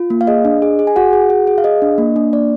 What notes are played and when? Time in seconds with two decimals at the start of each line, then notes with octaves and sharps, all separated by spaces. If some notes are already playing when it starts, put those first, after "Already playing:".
Already playing: F4
0.10 A#3
0.21 F5
0.27 G#4 D#5
0.45 D4
0.62 G#4
0.79 G#4
0.87 G#5
0.96 F#4 G#4 F#5
1.13 G#4
1.30 G#4
1.47 G#4
1.58 F5
1.64 G#4 D#5
1.82 D4
1.98 A#3
2.16 D4
2.33 A#3 D5